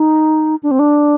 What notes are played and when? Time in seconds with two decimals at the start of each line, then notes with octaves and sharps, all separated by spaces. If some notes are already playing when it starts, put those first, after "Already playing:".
Already playing: D#4
0.63 D4
0.71 C4
0.79 D4